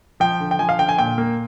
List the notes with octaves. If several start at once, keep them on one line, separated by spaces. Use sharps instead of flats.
F3 G5
D3
G5
F3 G#5
F5
D3 G5
G#5
A#2 G5
A#3